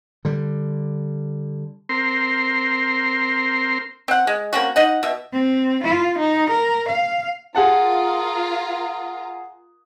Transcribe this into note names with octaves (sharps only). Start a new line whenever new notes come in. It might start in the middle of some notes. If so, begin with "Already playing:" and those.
D3 G3
C4 A#4 C6
C4 F#5
G#3
A#3 C4 C#4 F#4
D#4 D#5 F#5
B2 E5
C4
F4
D#4
A#4
F5
F4 G#4 A#4 F#5 A5 A#5